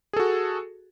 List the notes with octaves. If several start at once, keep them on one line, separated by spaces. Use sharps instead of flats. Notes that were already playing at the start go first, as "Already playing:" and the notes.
F#4 G#4 A4